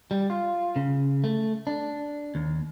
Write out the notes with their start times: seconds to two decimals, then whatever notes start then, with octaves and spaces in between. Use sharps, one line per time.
0.11 G3
0.30 F4
0.76 C#3
1.24 A3
1.67 D4
2.35 D#2